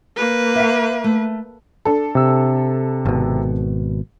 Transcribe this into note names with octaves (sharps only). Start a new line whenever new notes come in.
A#3 B4
E5 F5
A3
D4 A4
C3 E6
G#1 B2